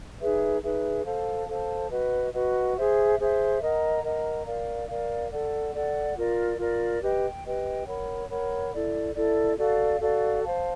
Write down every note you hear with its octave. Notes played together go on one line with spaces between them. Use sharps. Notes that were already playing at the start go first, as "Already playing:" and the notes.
D#4 G#4 B4 E5
D#4 G#4 B4 E5
A4 C5 F5 A5
A4 C5 F5 A5
F#4 B4 D#5 F#5
F#4 B4 D#5 F#5
G#4 C5 E5
G#4 C5 E5
A#4 D#5 F#5 A#5
A#4 D#5 F#5 A#5
A#4 D5 F5
A#4 D5 F5
A4 D5 F#5
A4 D5 F#5
F4 A#4 D5
F4 A#4 D5
G4 B4 D#5 G5
G4 B4 D#5 G5
A#4 C#5 F#5 B5
A#4 C#5 F#5 B5
E4 A4 D5
E4 A4 D5
F#4 A4 D5 F5
F#4 A4 D5 F5
C5 F5 A5